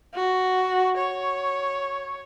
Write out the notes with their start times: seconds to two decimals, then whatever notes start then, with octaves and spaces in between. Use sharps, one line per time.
0.14 F#4
0.97 C#5